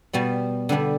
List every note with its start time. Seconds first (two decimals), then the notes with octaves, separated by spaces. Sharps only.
0.13 B2 G3 B3
0.69 D3 G3 B3 D4